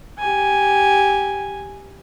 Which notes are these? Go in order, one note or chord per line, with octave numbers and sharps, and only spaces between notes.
G4 G#5